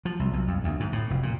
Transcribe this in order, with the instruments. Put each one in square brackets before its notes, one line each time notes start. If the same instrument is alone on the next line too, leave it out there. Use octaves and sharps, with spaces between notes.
[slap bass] F3
C2
B1
F2
D2
G#2
A2
F1
A#2